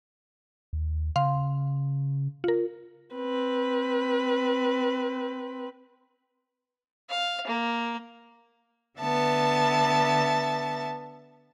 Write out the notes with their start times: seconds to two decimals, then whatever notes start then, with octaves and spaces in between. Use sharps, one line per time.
0.73 D#2
1.16 C#3 F5 C6
2.44 F4 A#4
3.15 C4 B4
7.10 F5
7.47 A#3
9.00 D3 B3 E5 A5 A6